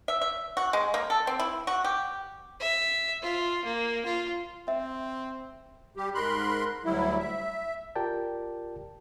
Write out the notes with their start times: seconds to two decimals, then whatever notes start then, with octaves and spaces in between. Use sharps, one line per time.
0.08 E5
0.22 E5
0.57 F#4
0.73 G#3
0.94 A#3
1.10 A4
1.27 C4
1.39 E4
1.67 F#4
1.84 G4
2.60 E5
3.22 F4
3.65 A#3
4.05 F4
4.68 C4 E5
5.97 G3 G4
6.15 G#2 A#4 B5 C6 F#6
6.85 D2 F#3 G3 E4
7.19 E5
7.95 F4 G4 A#4 D5 G5 A5